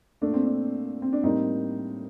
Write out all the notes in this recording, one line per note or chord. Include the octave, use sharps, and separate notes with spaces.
A#2 A3 D4
C4
D4
C4
D4
A2 G3 A#3 C4 D#4